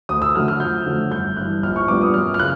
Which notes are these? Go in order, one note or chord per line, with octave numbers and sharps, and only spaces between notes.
D2 D#6
E6
D3 F#3 A3 F6
F6
F2 G6
D3 F#3 A3
G1 G6
G2 E3 F#6
A#1 F6
C#6
A#2 G3 B3 D4 D6
D#6
F#2 F6
F6
C#3 F#6